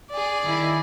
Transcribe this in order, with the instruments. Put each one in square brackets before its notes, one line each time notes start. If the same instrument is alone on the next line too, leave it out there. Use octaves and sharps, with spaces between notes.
[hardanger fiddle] G#4 D5
[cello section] D#3 E4